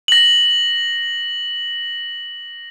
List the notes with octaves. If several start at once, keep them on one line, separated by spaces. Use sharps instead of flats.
A#6 F#7